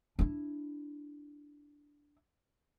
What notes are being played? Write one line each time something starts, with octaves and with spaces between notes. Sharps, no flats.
D4 E4